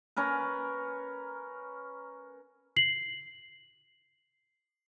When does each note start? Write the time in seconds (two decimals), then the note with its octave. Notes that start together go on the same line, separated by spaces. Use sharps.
0.17 C#4 A#4 B4
2.76 C7 F#7